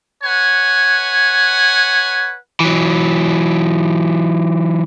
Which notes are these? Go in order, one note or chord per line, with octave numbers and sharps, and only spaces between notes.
B4 C#5 F#5 G#5
E3 F#3